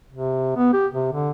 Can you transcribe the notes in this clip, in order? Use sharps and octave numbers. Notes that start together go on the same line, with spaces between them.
C3
B3
G4
C3
D3